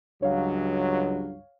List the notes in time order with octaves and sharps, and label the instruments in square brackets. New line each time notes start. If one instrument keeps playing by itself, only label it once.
[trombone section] C#2 F#3 [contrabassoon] G2 [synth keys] C#5 F5